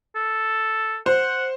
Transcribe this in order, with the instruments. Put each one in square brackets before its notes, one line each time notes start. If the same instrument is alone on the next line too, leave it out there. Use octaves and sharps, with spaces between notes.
[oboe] A4
[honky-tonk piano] C5 [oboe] F#5